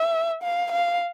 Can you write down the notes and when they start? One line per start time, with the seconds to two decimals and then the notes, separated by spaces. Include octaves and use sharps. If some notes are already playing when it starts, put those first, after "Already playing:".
Already playing: E5
0.43 F5
0.72 F5